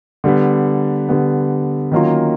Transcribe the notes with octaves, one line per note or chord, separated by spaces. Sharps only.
D3 G3 B3
D3 G3 B3
D#3 F#3 A#3 C#4 F4